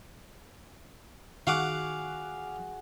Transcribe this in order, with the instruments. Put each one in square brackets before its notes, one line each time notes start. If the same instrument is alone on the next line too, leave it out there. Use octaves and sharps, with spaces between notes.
[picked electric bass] D#3 [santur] F#4 G#4 [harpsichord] F5 F#5 D6